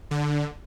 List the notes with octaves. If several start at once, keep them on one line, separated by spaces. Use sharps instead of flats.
D3